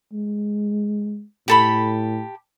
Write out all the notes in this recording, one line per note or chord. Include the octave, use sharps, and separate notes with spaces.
G#3
A2 G4 A4 B5